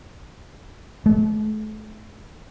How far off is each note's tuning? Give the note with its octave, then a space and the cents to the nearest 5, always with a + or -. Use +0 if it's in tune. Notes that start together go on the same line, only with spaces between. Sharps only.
A3 -40